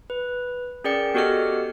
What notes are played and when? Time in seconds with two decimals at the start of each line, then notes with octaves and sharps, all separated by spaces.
0.10 B4
0.84 C#4 G#4 A#4 D5 G5 C#7
1.14 B3 F#4 G4 A4 D#5 F6